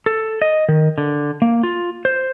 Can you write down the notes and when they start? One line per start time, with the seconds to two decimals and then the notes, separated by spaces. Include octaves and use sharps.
0.06 A4
0.42 D#5
0.69 D#3
0.98 D3
1.42 A#3
1.63 F4
2.05 C5